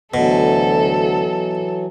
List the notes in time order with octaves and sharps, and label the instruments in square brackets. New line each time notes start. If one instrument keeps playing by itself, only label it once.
[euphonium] D2 [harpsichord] B2 [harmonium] E3 F#3 [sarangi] A4